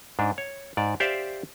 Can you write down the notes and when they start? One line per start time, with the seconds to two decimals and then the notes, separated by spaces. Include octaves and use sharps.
0.19 G#2 D4
0.38 C#5
0.77 G#2 D5
1.00 G4 C5 D5 E5 F5